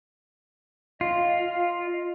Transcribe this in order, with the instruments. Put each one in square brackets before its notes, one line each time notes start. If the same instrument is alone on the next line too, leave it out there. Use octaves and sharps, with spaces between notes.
[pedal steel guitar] F4 [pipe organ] D#5